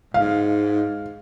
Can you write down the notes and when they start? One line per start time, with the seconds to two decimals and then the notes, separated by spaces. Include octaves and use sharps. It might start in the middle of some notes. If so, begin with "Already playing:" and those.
0.14 G#2 F5